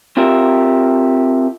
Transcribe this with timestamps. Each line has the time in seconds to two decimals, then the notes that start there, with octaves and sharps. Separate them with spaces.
0.17 C4 F4 G4 A#4 E5